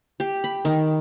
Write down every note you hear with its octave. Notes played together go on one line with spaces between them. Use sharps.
G4
B5
D#3